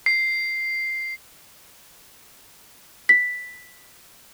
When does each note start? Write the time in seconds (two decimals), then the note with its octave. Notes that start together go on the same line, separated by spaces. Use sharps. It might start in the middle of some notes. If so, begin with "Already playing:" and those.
0.06 C7
3.09 B6